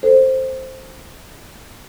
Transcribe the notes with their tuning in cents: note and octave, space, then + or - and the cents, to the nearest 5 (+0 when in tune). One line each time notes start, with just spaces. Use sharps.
A4 +10 C5 +5